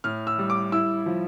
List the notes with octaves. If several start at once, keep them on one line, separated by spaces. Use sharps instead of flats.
A2 F6
E6
G3
D6
E4 E6
F3